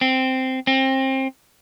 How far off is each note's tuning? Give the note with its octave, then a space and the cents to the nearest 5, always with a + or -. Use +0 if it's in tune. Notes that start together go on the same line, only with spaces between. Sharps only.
C4 -5
C4 +25